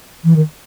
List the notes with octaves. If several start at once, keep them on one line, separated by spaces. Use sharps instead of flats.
E3
D#3